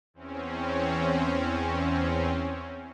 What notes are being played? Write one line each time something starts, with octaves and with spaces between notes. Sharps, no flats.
E2 C4 C#4